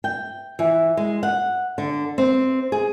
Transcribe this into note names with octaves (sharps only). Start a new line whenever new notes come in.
G5
E3
G#3
F#5
D3
C4
G#4